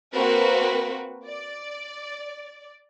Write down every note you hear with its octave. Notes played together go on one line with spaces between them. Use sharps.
A#3 C4 F#4 A#4 B4
D5